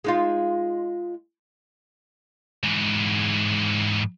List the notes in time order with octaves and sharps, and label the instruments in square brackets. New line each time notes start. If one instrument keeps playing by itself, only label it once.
[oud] G#3 D#4 F4
[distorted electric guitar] G#2 E3